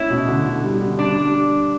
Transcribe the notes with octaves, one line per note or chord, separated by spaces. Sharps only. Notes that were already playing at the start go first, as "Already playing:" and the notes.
Already playing: A3 C#4 E4
B2
D3
D3
G3
D3
G3 D4
G3